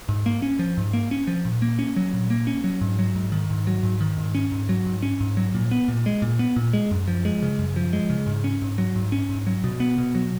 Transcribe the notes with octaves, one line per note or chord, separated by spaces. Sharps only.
G#2
A#3
C#4
F3
G#2
A#3
C#4
F3
A#2
A#3
C#4
F#3
A#2
A#3
C#4
F#3
G#2
F#3
G#2
D#3
G#2
F#3
G#2
D#3
G#2
C#4
G#2
F#3
G#2
C#4
G#2
F#3
A#2
B3
A#2
G#3
A#2
B3
A#2
G#3
F#2
F3
G#3
C#3
F#2
F3
G#3
C#3
G#2
C#4
G#2
F#3
G#2
C#4
G#2
F#3
B2
B3
B2
F#3